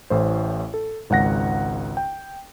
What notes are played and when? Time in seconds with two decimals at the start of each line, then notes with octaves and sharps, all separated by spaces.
0.10 A1 A2 C5
0.74 A4
1.10 G#1 C#2 F#5 A#6
1.97 G5